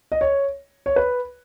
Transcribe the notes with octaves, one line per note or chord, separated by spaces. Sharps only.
D#5
C#5
C#5
B4